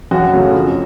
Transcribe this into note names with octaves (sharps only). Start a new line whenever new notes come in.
F#2 F#4
C#3 F#3 A3
F2